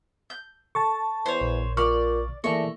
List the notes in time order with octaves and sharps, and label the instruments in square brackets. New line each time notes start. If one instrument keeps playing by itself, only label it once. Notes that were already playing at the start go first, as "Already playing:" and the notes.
[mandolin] G6
[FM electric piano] A4 A5 [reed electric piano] C#6
[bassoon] E2 [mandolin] C5 C#5
[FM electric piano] A#1
[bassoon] A#2 [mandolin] D5 [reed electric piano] C#6 F6
[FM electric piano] E3 A#3 [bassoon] A3 [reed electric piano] G#4 D5 [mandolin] C#6